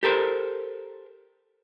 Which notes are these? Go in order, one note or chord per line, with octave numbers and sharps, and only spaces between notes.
G4 A4 A#4 C5